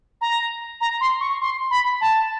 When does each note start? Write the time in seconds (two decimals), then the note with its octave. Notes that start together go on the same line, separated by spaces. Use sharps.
0.21 A#5
0.81 A#5
1.01 C6
1.20 C#6
1.41 C6
1.71 B5
2.01 A5